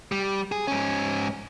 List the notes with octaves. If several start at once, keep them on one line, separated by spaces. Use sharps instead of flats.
G3
G#4
G#2 C#4